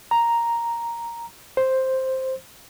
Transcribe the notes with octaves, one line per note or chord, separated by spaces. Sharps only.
A#5
C5